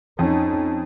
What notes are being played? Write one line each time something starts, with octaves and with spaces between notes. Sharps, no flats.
F2 C#4 D#4